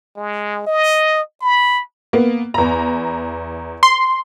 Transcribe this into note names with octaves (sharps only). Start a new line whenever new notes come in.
G#3
D#5
B5
A#3 B3
E2 A#5
C6